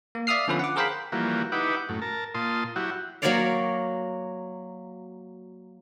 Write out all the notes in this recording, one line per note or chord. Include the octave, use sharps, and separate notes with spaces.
A#3
D5 E5 F5 D#6 F6 C7
D3 F3 B3 C#4 F4 B4
F#5 D6
G#4 A#4 C5 F5 G5 B5
E3 F3 G3 A#3 F#4
D#4 E4 G4 B4 F#5 D6
F#2 A2
A#4 A5
A#2 F4 A5 C6 D#6
F#3 E4 F#4 G4
F#3 A#3 F#4 C#5 D5 F5